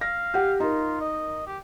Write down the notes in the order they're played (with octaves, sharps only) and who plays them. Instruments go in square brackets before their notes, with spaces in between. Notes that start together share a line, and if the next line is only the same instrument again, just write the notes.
[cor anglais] F5 [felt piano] A#6
[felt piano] G4 F#5
[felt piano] D#4 A#4 [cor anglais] F4
[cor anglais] D#5
G4